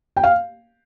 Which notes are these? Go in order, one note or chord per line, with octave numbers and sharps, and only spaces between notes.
G5
F5